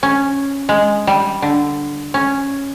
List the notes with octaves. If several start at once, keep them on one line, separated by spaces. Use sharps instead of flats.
C#4
G#3
G3
D3
C#4